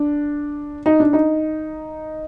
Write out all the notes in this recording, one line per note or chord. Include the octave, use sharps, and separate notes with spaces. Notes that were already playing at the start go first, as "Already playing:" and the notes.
Already playing: D4
D#4
D4
D#4